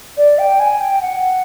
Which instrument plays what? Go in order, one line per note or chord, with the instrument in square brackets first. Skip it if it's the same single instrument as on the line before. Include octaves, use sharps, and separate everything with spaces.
[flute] D5
G5
G#5
G5
F#5